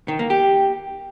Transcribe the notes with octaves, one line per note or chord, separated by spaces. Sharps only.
D#3
A#3
G4